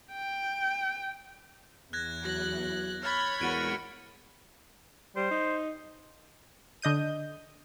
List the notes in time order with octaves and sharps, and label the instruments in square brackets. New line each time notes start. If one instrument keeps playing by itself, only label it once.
[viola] G5
[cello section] E2 [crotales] F#6 G#6 A#6
[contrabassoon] F#3 [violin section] F#6 [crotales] A#6
[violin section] C#5 B5 G#6 [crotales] F6 A6
[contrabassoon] E2 [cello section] G#3 F#4 A#4 [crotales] A6 D7 D#7
[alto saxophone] G3 [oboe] C5
[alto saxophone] D#4
[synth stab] D3 D#5 G6 D#7